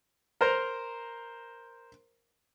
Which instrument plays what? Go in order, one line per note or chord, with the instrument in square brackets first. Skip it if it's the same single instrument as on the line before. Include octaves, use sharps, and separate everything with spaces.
[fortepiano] A#4 C5 A#5